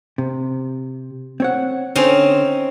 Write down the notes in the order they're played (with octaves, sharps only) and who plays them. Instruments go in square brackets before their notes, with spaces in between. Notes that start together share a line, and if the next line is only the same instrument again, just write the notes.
[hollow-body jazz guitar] C3
C4 C#5 F#5
[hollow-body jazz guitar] D3 C5 [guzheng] C4 C#4 D#4